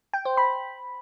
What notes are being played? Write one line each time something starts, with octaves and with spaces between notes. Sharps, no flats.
G5
C5
B5